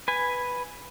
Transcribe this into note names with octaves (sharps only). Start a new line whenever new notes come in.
B4 G#5